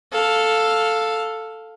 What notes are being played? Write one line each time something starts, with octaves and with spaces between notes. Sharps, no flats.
A4 F5